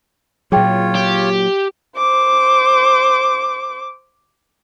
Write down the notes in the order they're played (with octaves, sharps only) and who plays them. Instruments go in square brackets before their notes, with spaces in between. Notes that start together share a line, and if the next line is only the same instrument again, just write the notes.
[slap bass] A#2 F#3 [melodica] F4 C#5 [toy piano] G#4 G5
[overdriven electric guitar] G4
[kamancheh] C5 D6